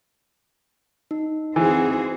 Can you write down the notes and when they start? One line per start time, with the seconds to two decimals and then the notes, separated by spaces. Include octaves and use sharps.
1.11 D#4
1.56 E3 C4 F#4 G#4